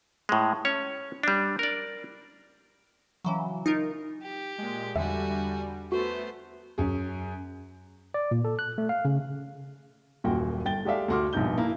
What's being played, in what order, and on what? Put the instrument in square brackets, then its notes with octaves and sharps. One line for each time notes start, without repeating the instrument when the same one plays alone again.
[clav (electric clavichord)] A2 G#3
C#4 C#5
G3 D4
A#4 D5
[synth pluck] C#3 E3 F#3
D#4 F4 A#4
[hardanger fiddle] G4
[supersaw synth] A#2 G#3
[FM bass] E2 [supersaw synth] D3 G3 [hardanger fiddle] F#4 G#5 [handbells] E5
[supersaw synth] A3 [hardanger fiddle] B3 C5 [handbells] F#4
[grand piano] F#2 C#4 G#4
[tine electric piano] D5
A#2
A4
F#6
A3
F5
C#3
[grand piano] D#1 F#2 A#2 F#4 G5
G1 G5 A6 G7
G#3 G4 A4 D5 E5 F5
D2 A3 F#4 C6 D6 F6
A#1 G2 B2 D#4 G6 G7
A#3 E4 A#4